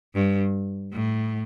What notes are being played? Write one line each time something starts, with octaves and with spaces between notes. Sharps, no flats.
G2
A2